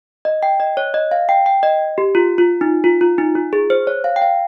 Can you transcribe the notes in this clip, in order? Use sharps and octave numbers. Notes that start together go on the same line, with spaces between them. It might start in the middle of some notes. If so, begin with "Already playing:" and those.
D#5
G5
D#5
C#5
D#5
F5
G5
G5
D#5
G4
F4
F4
D#4
F4
F4
D#4
F4
G#4
C5
C#5
F5
G5
F5